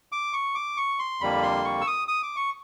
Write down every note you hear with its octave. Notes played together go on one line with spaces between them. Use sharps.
D6
C#6
D6
C#6
C6
F2 D3 G3 A#3 B5
C6
C#6
E6
D#6
D#6
D6
C#6